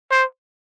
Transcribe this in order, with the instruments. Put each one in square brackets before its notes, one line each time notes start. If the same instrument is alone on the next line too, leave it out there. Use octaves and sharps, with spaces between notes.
[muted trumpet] C5